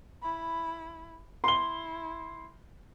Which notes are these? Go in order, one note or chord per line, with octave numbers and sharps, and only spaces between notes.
E4 B5
E4 C6 G7